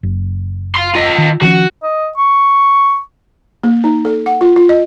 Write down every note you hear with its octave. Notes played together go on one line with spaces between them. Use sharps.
F#1
F5 C6
F4 D#5
D#3
D#3 F3 C#4 F#4
D#5
C#6
A#3
D#4
A4
F#5
F4
F4
D#5